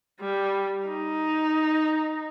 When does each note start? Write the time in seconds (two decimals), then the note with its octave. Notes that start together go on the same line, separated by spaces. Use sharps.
0.20 G3
0.87 D#4